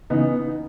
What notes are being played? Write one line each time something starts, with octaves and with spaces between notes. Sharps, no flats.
C#3 E3 B3 D#4